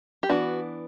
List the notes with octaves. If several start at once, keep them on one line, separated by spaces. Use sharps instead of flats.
G4
E3 B3 D4 F#4